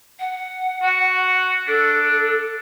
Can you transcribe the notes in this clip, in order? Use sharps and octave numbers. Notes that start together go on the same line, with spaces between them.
F#5
F#4
D4 A4